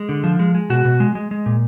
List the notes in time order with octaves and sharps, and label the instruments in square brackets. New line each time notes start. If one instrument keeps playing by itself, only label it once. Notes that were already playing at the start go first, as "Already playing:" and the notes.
Already playing: [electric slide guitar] G#3
D3
F3
G#3
G#3
B2 F#4
B2
G#3
G#3
G#3
A#2